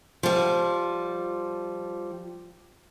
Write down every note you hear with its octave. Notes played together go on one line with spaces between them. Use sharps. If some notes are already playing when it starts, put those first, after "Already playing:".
F3 G3